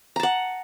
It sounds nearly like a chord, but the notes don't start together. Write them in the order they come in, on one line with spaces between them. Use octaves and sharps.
A#5 A5 F#5